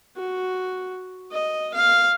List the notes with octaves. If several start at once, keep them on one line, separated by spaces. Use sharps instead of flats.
F#4
D#5
F5